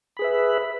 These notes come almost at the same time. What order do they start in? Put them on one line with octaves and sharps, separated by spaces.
B5 G#4 B4 E5